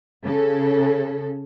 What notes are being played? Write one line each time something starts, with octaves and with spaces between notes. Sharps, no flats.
C#3 A4